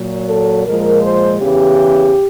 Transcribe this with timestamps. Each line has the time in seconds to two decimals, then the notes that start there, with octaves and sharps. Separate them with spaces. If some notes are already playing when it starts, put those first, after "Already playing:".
Already playing: A#2 F#3
0.28 A4
0.66 A#2 F3 G#3 A#4
1.02 C5
1.39 E2 C#3 E3 G4